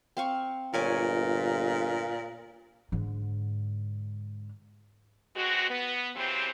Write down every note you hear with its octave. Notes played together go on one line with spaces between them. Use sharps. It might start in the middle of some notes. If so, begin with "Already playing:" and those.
C4 F5 C#6
G1 A#2 C#5 G#5 D6
G#2 D3
B2 G#3 C4 F#4
B3
C#3 E3 F#3 C4 G4 C5